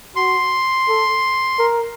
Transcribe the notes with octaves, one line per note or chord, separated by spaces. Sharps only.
F#4 C6
A4
A#4